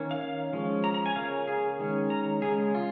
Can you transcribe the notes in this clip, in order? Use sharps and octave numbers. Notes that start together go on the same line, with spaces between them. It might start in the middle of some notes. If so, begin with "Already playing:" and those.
Already playing: D#3 A#3 C#4
F5
F5
F3 G#3 C#4
A#5
A#5
G#5
C#3 A#3 C#4 F5
G#4
D#3 G#3 C#4
A#5
C#3 G#3 C#4 G#4
F4